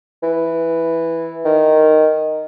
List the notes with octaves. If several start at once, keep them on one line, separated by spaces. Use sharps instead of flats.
E3
D#3